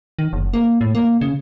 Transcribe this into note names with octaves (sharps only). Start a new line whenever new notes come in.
D#3
F#1
A#3
A2
A#3
C#3